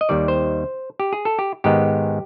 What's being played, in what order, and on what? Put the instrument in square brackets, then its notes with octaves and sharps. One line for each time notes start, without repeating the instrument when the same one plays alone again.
[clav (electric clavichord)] D#5
D#2 D#3 G3 D5
C5
G4
G#4
A4
G4
G#2 D#3 G#3 B3 G4